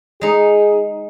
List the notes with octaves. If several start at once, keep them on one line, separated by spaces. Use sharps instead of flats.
G#3 D#4 G#4